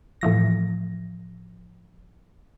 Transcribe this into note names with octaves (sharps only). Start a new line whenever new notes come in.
A2 E3 F3 A#6